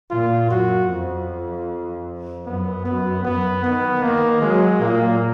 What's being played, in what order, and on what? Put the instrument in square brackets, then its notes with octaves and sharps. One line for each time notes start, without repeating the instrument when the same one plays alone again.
[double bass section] A#2 [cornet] F4
[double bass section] F#2 [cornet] F#4
[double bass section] F2
[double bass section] F#2 [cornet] B3
[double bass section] F#2 [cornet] B3
[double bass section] F#2 [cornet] B3
[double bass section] D#3 [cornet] B3
[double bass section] D#3 [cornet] A#3
[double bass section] F#3 [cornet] G#3
[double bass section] A#2 [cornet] A#3